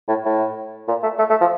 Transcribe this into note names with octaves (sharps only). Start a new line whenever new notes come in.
A2
A2
A#2
A3
A3
A3
F3